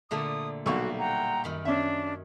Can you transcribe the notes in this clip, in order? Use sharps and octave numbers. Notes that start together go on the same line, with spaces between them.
A#2 D3 A3 D#6
B1 G3 A#3 E4 F#4 C#6
F#5 G5 A#5
F#2 D#3 B5
C#4 D4 E5